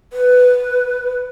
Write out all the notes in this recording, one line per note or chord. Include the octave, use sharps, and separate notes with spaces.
B4